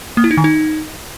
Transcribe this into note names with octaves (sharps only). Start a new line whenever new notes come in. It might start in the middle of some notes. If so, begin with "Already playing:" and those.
A#3
E4
D#4
D#3
D#4